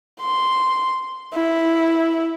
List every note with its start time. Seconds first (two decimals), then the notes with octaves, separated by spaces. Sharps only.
0.20 C6
1.34 E4